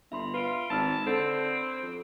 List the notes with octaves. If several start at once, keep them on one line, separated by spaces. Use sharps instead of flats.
G1 E5 B5 C6
F4 B4 B5 D7
G#1 A5 B5 E6 F6
D3 C4
F2